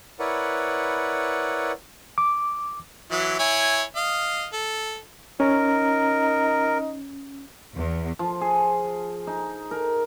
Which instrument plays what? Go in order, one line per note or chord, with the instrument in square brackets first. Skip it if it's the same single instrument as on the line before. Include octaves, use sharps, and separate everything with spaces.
[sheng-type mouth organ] E4 A#4 B4 C#5 D5 F#5
[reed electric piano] D6
[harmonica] E3 F#3 E4
E4 C#5 G#5
D#5 F5
A4
[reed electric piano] C#4 [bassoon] D#4 [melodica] A#4
[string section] E2
[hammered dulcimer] F3
G#4
D#4
A#4